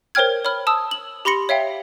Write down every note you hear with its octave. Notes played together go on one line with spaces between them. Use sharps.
A#4 C5 C#5 G5 F6 G#6
C#5 B5 F6
A5 D#6 E6
F#7
G4 B5 C6 A#6 C#7
C#5 E5 F5 G5